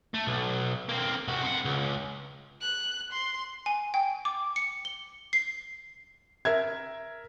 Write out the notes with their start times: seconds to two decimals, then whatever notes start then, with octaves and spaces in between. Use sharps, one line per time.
0.14 A3
0.27 B1
0.89 A#3 C4
1.28 C2 F#4
1.43 C4 F#5
1.65 C#2
2.61 F#6
3.12 C6
3.66 G#5
3.94 G5
4.25 D6
4.56 C#7
4.85 G7
5.33 C7
6.45 A#4 E5 G#6